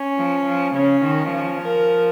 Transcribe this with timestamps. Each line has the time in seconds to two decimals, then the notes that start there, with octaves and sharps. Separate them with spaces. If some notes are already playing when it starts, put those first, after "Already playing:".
Already playing: C#4
0.18 F3
0.47 F3
0.75 C#3 C#4
1.03 D#3
1.32 F3
1.61 A#4